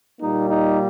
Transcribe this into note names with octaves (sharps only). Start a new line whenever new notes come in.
A#2 G3 A#3 D#4
D#4